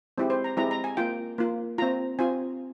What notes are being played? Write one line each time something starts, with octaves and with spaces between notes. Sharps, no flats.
G#3 C4 E4 G4
C5
A#5
G#3 C4 E4 G4 A#5
A#5
G#5
A#3 F4 G5
A#3 F4
C4 F4 A#5
C4 F4 G#5